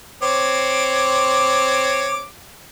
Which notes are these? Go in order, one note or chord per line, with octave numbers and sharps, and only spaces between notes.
C4 C#5 D6